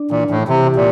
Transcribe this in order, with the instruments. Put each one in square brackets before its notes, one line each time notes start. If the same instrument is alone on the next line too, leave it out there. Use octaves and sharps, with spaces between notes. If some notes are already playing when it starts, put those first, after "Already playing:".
Already playing: [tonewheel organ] D4
[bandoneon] A#2 [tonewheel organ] E3
[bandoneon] A2 [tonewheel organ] E3
[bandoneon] C3 [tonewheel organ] E3
[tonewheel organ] G4
[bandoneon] A#2